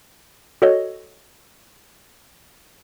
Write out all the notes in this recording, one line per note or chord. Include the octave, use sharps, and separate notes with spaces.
F#4 A4 C#5 D#5